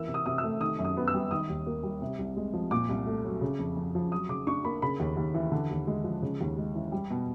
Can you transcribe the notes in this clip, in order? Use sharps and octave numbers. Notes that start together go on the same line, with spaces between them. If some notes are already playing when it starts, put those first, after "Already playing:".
Already playing: E3 A#3 E6
C3
D#6
C3 D#6
E6
A3
D#3 D#6
F#2
D#6
B3
E6
G3
D#3 D#6
D#2
A#3
G3
C3
C2
G#3
F3
A#2 D6
C2
A3
F#3
C#3
F2
F2
F3
F#3 D#6
C#3 D6
D4 C#6
A#3 B5
C#3 B5
D#2
D#2
E3
D3
D#2
G#3
F3
C#3
D#2
G#3
E3
G3
B2